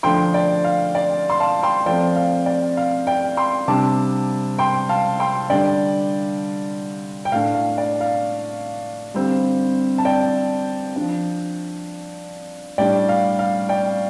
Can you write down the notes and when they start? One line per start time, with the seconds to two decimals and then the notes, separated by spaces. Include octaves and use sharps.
0.03 D3 F3 A3 D4 G5 C6
0.34 D5 G5
0.64 F5
0.95 D5
1.30 C6
1.40 F5 A5
1.63 G5 C6
1.86 F3 A3 C4 D5 G5
2.16 F5
2.46 D5
2.77 F5
3.07 D5 G5
3.37 G5 C6
3.68 C3 G3 D4 A5 D6
4.59 G5 C6
4.89 F5 A5
5.20 G5 C6
5.50 D3 G3 D4 D5 G5
7.25 G5
7.32 A2 A3 D4 F5
7.55 F5
7.78 D5
8.01 F5
9.14 D3 G3 C4
9.98 A5
10.05 D5 G5
10.96 F3 D4
12.78 A2 G3 D4 D5 G5
13.09 F5
13.39 F5
13.69 D5 G5